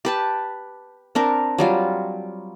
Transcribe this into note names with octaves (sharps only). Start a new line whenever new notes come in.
G4 B4 A5
C4 D4 A#4
F#3 G3 F4